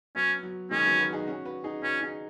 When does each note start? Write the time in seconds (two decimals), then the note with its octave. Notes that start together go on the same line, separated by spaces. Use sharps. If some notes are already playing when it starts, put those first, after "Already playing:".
0.16 F#3 B3 C#4
0.43 F#3
0.71 D#3 G#3 C#4
0.85 F#3 B3
0.99 F#4 B4
1.13 D#4 G#4
1.27 C#4 F#4
1.45 F#4 B4
1.64 D#4 G#4
1.83 C#4 F#4 B4
2.01 D#4 G#4